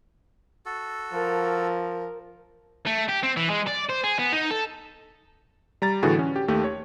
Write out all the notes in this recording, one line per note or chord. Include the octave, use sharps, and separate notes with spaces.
F#4 A4
F3 A#4
A3
G4
C4
E3
G#3
D5
C5
G#4
B3
D#4
A4
G3 A#5 A6
A2 D3 E3 F#4 G#4
C#4
G4
D#2 A3 G4
C#5